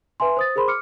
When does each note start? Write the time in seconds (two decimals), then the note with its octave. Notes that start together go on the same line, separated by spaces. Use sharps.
0.20 B4 E5 G#5 C6
0.37 C5 D#6 A6
0.56 G#4 A#4 C5 B5 C6
0.68 D6 F6 C#7